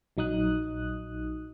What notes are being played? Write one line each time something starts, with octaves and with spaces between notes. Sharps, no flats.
A#1 F#3 D#4 D#6 F#6